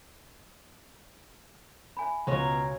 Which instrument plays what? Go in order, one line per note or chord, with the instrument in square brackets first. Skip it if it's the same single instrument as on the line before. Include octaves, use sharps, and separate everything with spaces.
[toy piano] E5 G#5 B5
[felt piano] C#2 [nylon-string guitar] B2 C#5 [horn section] B3 F5 A#5 [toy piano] D#5 C6